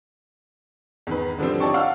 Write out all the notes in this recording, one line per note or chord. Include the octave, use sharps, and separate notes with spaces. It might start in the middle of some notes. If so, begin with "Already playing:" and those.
E2 D#3 B4
D3 E3 F3 G3 C4
D#4 C#5 D5 G5 A5 C#6
F5 F#5 E6 F6